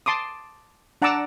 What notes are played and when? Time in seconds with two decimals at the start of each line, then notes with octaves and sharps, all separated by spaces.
0.06 A5 C6 D6 D#6
1.02 D4 F#5 A5 A#5 D6 E6